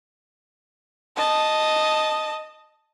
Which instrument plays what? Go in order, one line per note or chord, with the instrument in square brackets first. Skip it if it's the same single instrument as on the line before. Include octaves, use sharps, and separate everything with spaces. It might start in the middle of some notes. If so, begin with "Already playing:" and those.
[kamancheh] D#5 A5